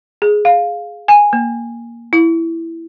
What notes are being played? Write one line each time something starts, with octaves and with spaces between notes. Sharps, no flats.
G#4
F5
G#5
A#3
E4